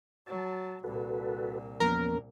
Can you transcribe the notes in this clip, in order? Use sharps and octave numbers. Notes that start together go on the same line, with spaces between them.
F#3 A5
C2 A#2 F#4 A4 B4
E2 F3 A#3 B3 C#4 A#4